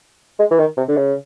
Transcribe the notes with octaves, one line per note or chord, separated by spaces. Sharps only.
G#3
E3
D#3
C3
D3
C#3